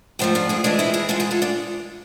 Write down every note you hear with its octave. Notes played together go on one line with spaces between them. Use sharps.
G#2 F3 A3 C4
D4 F4
E4 G#4
F2 E3 G#3 D4 F4
C4 E4
E4 G#4
G#2 G#3 F4 A4
E4 G#4
F4 A4
D4 F4